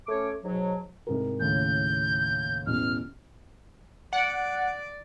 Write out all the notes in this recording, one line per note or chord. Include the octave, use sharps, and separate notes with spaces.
A3 C#4 C#5 D6
G#2 B2 F#3
C2 G#2 A#4
D#2 A2 C#3 G6
A1 E2 B2 F6
D5 F#5